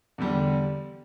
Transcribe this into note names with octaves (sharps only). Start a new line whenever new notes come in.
E2 D3 G3